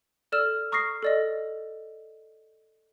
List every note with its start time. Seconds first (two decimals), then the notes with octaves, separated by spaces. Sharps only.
0.32 A4 D5 E6 F6 E7
0.72 A#5 C#6 D#6 F6 A#6 C7
1.02 A4 D5 D#5